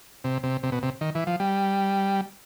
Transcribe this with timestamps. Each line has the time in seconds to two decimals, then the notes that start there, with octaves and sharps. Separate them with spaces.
0.24 C3
0.43 C3
0.63 C3
0.72 B2
0.83 C3
1.01 D#3
1.15 E3
1.27 F3
1.40 G3